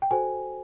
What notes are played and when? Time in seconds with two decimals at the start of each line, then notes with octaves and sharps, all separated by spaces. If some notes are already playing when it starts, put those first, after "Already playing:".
0.02 G5
0.11 F#4 A4 C5 G#5